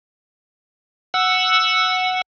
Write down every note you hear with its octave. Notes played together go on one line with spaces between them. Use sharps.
F#5 E6